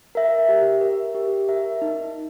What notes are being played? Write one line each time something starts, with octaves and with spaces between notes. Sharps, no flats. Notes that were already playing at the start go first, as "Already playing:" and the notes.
A#4 E5
G4
A#4 E5
G4
A#4 E5
D#4